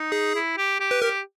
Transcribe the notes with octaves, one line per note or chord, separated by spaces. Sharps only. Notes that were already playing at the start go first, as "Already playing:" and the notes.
Already playing: D#4
G#4
E4
G4
G4
B4
G4 A#4